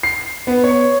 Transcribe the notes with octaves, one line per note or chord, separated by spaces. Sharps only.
C7
B3
C#5